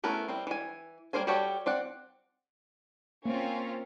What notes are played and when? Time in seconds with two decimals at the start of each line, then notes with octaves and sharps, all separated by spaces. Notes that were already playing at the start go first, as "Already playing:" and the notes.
0.04 A3 B3 C#4 E4 A#4
0.28 G3 C4
0.47 E3 G#5
1.13 G3 A#3 A#4 C5 G#5
1.27 G3 F#4 G4 A4 C#5
1.66 C4 D5 F#5
3.25 A#3 C4 C#4 F4